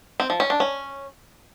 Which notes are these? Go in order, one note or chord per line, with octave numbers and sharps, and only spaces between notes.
C4
F3
C#4
D4
C#4